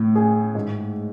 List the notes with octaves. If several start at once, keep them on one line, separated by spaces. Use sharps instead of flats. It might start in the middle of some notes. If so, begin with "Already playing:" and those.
Already playing: A2
G#4
G#2